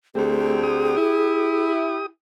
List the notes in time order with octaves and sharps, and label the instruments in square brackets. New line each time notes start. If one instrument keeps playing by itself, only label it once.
[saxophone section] D2 D3 C4 [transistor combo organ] A3 G4 [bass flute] G#4
[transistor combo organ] G4 D#6
[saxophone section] E4